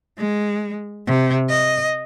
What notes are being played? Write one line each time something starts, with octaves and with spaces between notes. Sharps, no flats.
G#3
C3
D#5